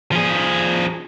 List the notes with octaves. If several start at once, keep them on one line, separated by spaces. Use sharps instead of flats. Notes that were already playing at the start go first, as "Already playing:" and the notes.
F3 G#4